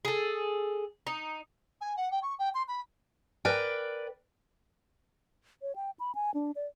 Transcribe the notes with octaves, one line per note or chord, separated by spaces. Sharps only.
G#4 A4
D#4
G#5
F#5
G5
C#6
G5
C6
B5
A#4 B4 D5 G5
C#5
G5
B5
G#5
D4
D5